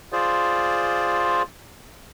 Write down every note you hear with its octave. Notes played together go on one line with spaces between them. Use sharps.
F4 G#4 C5 D5